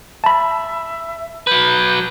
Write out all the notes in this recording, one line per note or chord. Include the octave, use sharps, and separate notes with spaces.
E5 A5 B5
F#3 B4 G6